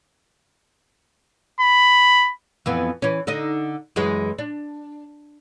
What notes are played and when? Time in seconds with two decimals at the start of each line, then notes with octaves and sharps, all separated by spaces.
1.61 B5
2.66 F2 E3 B3
3.02 E3 C#4
3.27 D3 D#4 D#5
3.96 F#2 E3 G#3
4.39 D4